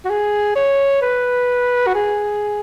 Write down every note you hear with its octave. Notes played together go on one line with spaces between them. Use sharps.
F#4
G#4
C#5
B4
F#4
G#4